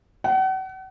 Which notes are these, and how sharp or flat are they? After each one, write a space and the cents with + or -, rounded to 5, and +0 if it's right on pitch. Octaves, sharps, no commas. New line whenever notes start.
F#5 +40